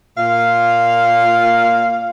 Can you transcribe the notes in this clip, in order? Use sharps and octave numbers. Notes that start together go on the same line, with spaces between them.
A#2 F5